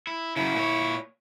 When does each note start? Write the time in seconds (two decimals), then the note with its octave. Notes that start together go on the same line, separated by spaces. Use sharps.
0.07 E4
0.36 C#3 F#3 E4
0.55 A#2 C#5